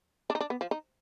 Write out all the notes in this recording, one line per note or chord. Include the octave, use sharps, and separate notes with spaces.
D4
D#4
D4
B3
F3
D#4